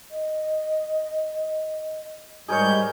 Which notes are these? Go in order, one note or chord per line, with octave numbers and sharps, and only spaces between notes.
D#5
G#2 G3 G#4 A#4 C#5 D#5 G6